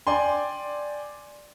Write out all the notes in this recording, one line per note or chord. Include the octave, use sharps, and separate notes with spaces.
D5 G5 G#5 C6